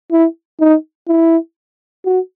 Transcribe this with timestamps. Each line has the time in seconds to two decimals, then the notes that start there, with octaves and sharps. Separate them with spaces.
0.11 E4
0.60 D#4
1.08 E4
2.05 F#4